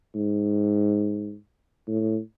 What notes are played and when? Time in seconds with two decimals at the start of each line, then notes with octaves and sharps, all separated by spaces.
0.15 G#2
1.88 A2